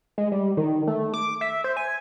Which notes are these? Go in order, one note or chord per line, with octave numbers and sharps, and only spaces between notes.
G#3
G3
D#3
A3
D6
E5
C5
G#5